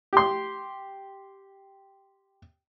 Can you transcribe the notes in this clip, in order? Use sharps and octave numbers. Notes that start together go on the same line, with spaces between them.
G4 C6